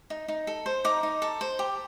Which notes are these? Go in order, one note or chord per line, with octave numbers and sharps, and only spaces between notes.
D#4
D#4
A4
C5
D#4 A#5 D6
D#4
A4
C5
G4